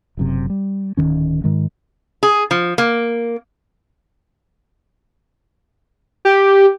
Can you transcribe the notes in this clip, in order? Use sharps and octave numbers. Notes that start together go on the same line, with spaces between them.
F#1 F#2 C3
G3
D1 E2 D#3 C#4
G#2 D#3 G#3
G#4
F3
A#3
G4